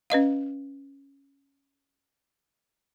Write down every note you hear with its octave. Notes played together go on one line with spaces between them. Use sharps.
C#4 B4 D#5 F5